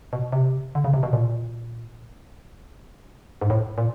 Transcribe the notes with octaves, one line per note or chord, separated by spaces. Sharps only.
B2
C3
D3
C#3
C3
B2
A#2
G#2
A2
A#2